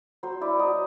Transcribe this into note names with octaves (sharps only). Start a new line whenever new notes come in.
F#3 C5
E4 D5
F#3 D#5